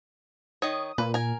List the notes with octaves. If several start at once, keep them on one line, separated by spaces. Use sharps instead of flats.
D#3 C#5 D#6
A#2 B4
A#4 G#5